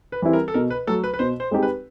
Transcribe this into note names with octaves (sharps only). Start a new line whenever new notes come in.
B4
E3 G3 C4 E4
A#4
A4
B2 A#4
B4
F#3 A3 A4
B4
B4
B2 C5
C5
G#3 C4 D#4 G4
B4